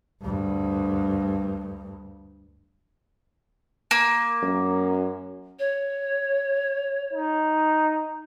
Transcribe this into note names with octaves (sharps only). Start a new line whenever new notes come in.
D2 G2
A#3
F#2
C#5
D#4